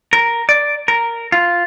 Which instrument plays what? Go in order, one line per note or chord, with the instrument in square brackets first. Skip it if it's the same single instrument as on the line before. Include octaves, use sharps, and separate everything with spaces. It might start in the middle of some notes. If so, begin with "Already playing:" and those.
[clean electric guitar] A#4
D5
A#4
F4